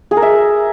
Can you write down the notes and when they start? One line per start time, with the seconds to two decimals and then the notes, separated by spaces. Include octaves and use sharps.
0.11 G#4
0.17 A#4
0.22 E5